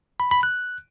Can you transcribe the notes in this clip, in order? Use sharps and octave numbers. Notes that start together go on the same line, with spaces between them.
B5
B5
F#6